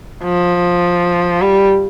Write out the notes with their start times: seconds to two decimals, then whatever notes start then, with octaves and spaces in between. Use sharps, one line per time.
0.24 F3
1.42 G3